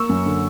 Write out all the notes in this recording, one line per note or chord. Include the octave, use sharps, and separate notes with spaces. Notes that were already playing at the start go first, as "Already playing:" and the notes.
Already playing: A#3 C#6 E6
F#2
D3